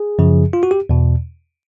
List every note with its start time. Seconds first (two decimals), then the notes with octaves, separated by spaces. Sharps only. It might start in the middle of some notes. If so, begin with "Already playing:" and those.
Already playing: G#4
0.19 F#2 C#3 F3
0.53 F4
0.63 F#4
0.71 G4
0.89 E2 B2